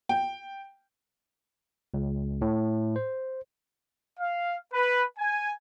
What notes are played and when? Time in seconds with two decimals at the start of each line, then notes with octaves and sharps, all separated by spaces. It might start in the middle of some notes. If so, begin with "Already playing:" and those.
0.09 G5
1.94 C#2
2.42 A2
2.96 C5
4.19 F5
4.72 B4
5.18 G#5